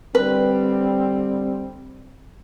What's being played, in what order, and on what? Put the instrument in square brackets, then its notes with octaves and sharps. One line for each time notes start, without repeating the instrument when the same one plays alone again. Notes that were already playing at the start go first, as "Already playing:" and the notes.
[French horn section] D3 G3 C4 [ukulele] B4